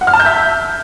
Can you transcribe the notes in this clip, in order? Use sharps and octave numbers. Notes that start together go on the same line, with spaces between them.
F#5
F6
A5
G6
E5